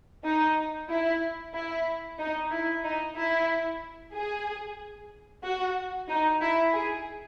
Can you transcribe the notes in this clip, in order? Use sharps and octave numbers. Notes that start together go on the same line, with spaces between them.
D#4
E4
E4
D#4
E4
D#4
E4
G#4
F#4
D#4
E4
G#4